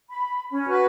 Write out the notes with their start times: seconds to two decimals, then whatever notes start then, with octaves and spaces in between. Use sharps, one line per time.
0.09 B5
0.51 C#4
0.67 F#4 B4